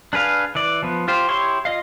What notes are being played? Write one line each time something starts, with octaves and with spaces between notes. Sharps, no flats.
D4 G#4 B4 F5
E3 D5
F3 B3
F4 G4 C5
E4 G4 C#5 C6 C#6
F4 D#5 F5